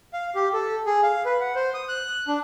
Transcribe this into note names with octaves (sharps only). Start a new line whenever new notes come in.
F5
G4
A4
G#4
F5
B4
F#5
C5
D#6
F#6
D4